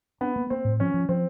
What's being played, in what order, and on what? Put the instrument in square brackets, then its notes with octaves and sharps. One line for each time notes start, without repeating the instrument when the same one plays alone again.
[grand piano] B3 [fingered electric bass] D4
[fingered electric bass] A#3
[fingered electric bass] A#3 [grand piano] C4
[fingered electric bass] A2
[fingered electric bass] F3 [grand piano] C#4
[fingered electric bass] F3
[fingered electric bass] F3 [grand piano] C4